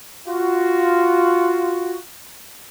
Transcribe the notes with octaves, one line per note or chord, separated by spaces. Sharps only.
F4 F#4